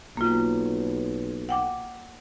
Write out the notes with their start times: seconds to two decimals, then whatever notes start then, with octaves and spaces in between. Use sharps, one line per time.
0.17 B1 A#3 F4
1.49 F#5 G5 D6